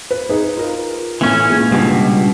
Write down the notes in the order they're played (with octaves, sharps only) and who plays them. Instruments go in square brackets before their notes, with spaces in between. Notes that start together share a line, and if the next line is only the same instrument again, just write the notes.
[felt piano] B4
D#4 G#4 B4
F4 A#4
[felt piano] A2 B3 [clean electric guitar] E3 C#4
[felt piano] A#2 G#3
[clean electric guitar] C#2 G2 B2